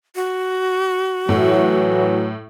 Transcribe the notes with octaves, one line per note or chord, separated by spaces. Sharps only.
F#4
A2 E3 F#3